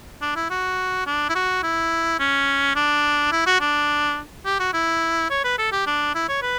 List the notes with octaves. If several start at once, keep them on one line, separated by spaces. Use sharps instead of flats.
D4
E4
F#4
D4
E4
F#4
E4
C#4
D4
E4
F#4
D4
G4
F#4
E4
C#5
B4
A4
G4
D4
E4
C#5
B4